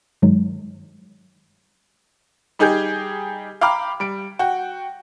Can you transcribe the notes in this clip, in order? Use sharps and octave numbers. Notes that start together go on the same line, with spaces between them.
G2 D#3 F#3 G#3 D#4
G3 D#4 G4 G#4 G5 G6
F5 G5 A#5 B5 D6 F6
G3 D7
F#4 G5